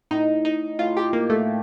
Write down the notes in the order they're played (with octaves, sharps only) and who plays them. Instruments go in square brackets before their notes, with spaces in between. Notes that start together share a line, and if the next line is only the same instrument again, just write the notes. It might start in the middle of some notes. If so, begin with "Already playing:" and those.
[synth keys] A2 D#4
D#4
A2 F4
G4
A#3
A3